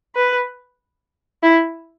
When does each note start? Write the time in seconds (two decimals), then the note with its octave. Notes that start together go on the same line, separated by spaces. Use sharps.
0.16 B4
1.43 E4